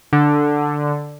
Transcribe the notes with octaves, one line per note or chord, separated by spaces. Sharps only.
D3